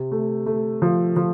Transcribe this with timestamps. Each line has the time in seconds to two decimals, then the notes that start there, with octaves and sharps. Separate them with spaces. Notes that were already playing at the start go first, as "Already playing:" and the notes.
Already playing: C3
0.12 A3
0.46 A3
0.82 F3
1.16 F3